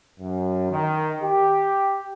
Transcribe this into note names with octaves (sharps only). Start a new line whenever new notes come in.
F#2
D#3
G4